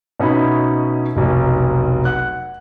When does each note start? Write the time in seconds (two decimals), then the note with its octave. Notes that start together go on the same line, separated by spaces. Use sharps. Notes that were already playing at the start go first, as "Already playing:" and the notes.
0.19 B2 C#4 D#4 E4 B5
1.16 F1 B1
2.05 F#5 F#6